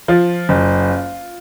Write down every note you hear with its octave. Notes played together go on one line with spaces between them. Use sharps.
F3 F4
F#1